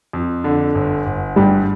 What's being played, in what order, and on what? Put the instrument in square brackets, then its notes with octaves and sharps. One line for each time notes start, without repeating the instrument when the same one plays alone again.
[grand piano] F2
D3
G1
G1
[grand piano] G2 [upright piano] G3